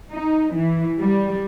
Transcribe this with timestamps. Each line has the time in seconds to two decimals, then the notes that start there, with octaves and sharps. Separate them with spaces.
0.12 D#4
0.54 E3
0.99 G3